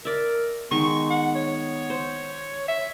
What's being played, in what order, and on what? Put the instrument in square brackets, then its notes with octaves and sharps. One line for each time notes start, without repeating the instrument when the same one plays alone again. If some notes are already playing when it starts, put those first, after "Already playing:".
[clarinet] A#4 [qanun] D5 E5
[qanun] D#3 G#3 [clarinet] B3 [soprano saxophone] C#6
[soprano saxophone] F#5
C#5
[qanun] C5
[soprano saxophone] E5